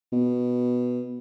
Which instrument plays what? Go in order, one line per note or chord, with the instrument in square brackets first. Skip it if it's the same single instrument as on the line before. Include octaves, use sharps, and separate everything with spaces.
[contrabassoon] B2